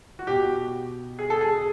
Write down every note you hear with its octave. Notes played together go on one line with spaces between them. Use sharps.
F#4
B2 G4
G#4
A4
G#4